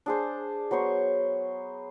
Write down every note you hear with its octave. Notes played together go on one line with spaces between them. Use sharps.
D4 G#4 C5
F#3 B3 C5 C#6